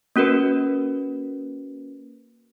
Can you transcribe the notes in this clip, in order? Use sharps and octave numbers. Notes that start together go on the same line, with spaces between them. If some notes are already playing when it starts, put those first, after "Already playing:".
A#3 C#4 F#4 A#4 B4